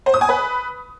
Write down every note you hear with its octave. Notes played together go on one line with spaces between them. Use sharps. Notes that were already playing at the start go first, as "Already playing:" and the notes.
C5
D#6
G#5
B4